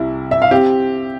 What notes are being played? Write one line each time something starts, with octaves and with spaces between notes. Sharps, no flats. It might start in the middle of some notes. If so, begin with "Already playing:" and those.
Already playing: C2 C3 E4
E5
F5
C4 G4